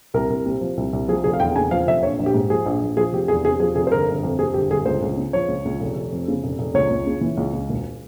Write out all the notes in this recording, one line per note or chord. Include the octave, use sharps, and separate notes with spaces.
C2 A#4
C2
C3
F3
C2
C2
F3 G#4
F1 G#4
F5
E2 G5
C#3 G#5
F3 F5
F1 E5
A#1 C#5
A#1
G4
G#2
F3 G#4
A#1
A#1
F3 G#4
F1 G4
E2 G#4
C3 G#4
F3 G#4
F1 G#4
C5
G1 A#4
G1
F2
C3 G#4
G1 G4
G1 G#4
C#2 C5
C#2
C#3
F3 C#5
C#2
C#2
F1
F1
F2
C#3
F1
F1
C#2 C#5
C#2
C#3
E3
C#2
C#2
E1